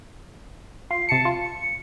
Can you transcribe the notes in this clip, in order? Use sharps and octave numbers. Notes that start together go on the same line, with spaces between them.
F4 C7
C3 A5 C#7
F4
C#7